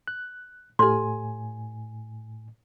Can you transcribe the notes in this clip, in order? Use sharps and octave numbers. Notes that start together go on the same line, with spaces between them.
F#6
A2 G4 A4 G#5 C6